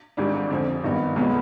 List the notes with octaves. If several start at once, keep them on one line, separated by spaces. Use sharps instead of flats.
G#1 G#2 G3 D4
F2 D3 F3
G#1 G2 D#3 B3 D#4
B1 B2 G#3 B3 F4